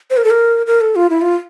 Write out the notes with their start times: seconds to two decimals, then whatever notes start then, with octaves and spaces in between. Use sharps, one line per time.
0.10 C5
0.17 A#4
0.24 A4
0.30 A#4
0.66 A#4
0.81 A4
0.96 F4
1.10 E4
1.21 F4